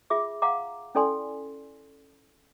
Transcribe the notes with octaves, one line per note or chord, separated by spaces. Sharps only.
F4 G#4 E5 D6
F5 F#5 A#5 D6
C#4 E4 A4 D5 G#5 C6